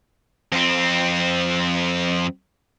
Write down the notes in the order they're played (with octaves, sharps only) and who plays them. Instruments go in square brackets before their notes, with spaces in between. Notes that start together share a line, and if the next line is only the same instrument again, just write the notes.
[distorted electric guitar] F2 C4